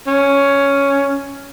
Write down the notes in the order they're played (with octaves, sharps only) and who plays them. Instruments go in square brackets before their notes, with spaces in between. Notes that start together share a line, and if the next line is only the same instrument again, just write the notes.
[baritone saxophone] C#4